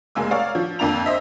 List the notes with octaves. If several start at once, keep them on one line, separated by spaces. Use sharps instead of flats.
F1 G#3 A#3 G#5 E6
A#4 C#5 D5 F5
F3
F2 D3 A#3 D4 A#5 F7
C5 D#5 E5